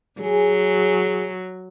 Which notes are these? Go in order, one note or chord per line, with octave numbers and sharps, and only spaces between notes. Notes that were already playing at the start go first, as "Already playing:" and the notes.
F#3 G#4